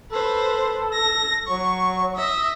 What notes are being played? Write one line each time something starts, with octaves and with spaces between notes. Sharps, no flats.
A4 B4 C5
A#6
F#3 C#6
D#5 E5